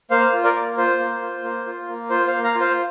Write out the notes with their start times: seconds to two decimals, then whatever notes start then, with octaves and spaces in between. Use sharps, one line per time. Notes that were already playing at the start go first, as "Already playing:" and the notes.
0.11 A#3 C5 F5
0.33 F4
0.44 A#4 D5
0.55 A#3
0.77 F4 C5
1.00 A#3
1.21 F4
1.44 A#3
1.66 F4
1.88 A#3
2.10 F4 C5
2.27 C5 F5
2.32 A#3
2.44 F5 A#5
2.55 F4
2.60 C5 F5